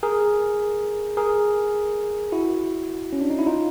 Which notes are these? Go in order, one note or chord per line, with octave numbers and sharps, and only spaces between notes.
G#4 A#4
G#4 A#4
E4 F#4
C#4
D4
D#4
E4
D#4 F4